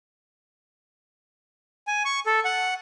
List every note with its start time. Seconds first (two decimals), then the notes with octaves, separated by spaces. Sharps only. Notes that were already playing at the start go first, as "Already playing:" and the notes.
1.87 G#5
2.05 C#6
2.26 A4
2.45 F#5